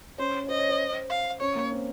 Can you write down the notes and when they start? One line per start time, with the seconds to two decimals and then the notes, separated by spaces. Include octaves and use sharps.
0.18 C#4 C5
0.44 C#5
0.49 C5 D#5
0.59 C#5
0.69 C5
1.09 F5
1.40 C#4 C#5
1.55 A#3
1.71 C4